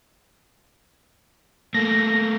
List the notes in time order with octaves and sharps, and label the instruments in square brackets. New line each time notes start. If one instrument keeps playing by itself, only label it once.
[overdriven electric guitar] A3 A#3 [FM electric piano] A#6